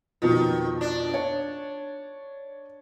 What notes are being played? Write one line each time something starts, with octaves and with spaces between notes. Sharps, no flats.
F2 B2 D#3
D4
C#5